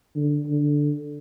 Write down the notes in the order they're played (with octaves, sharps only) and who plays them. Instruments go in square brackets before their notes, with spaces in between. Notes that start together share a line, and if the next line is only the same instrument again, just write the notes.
[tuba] D3
D3